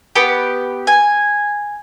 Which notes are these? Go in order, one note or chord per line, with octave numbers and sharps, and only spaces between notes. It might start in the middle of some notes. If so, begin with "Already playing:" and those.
B3 G4
G#5